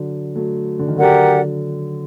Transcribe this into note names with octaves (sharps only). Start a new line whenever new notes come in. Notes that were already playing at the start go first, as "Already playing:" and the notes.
Already playing: D3 F#3
F#3 A3
D3
D#3
D3 F#3 G4 A#4 D5 F#5